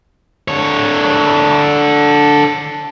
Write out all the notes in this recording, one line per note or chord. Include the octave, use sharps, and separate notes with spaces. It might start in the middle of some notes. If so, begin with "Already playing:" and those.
D3 C#5